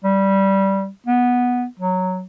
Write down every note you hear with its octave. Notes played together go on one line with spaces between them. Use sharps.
G3
B3
F#3